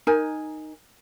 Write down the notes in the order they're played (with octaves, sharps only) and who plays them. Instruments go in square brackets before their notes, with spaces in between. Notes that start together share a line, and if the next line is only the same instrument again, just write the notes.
[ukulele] D#4 A#4 G#5